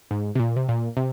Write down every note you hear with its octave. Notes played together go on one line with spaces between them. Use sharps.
G#2
C3
A#2
C3
A#2
C3